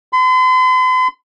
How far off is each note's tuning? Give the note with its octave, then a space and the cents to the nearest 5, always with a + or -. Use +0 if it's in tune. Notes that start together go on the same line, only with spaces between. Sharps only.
C6 -45